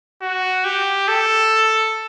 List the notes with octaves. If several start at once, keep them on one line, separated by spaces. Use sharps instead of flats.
F#4
G4
A4